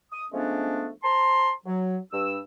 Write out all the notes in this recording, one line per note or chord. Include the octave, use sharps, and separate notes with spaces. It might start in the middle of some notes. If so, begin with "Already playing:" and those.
D#6
F3 G#3 A3 B3 C#4 D4
C5 A5 A#5 C6
F#3
G2 E6